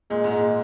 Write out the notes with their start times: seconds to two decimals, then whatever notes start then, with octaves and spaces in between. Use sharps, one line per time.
0.10 A#2 G#3
0.24 G#2
0.32 G#3
0.39 A#2